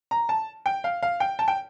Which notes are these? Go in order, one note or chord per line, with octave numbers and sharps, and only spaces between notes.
A#5
A5
G5
F5
F5
G5
A5
G5